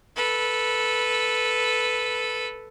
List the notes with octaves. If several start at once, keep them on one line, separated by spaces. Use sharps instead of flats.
A4 B4